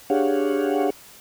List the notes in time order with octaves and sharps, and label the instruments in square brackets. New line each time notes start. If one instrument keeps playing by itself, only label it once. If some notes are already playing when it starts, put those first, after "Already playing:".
[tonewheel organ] D4 G4 G#4 C#5 F5 F#5